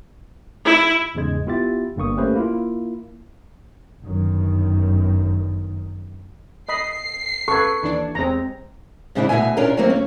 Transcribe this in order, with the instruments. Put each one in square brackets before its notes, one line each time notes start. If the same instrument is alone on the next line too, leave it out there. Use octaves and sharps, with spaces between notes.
[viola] E4
[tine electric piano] E2 G#2 C#3 G#3 G#6
B3 E4 F4 G4 E5 A6
G1 G2 A#3 C#6 D#6
A3 A#3 C#4 G4 B4 C5
A#3 E4 F4
[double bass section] G1 F#2 D#3
[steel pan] D#5 B5 [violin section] C7
[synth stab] C#3 [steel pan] A4 B4 [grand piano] C#6 G#6
[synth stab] D#2 E3 D4
[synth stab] E2 G#3 [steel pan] C4 A#5
[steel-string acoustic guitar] G#2 C#3 G3 D4 E4
D2 B2 F3 B3 E5 G#5
C#4 D4 E4 F4 A#4
D#3 F#3 A3 A#3 C4 D#4
C#4